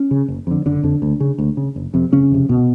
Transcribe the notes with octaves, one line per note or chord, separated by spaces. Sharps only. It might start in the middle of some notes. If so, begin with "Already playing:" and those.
Already playing: C#4
C#3
F#1
F2 D3
F#1 D3 D4
F2 D3
D2
C#3
D2
C#3
F#1
F2 C3
F#1 C#3 C#4
F2 C3
C2 B2 B3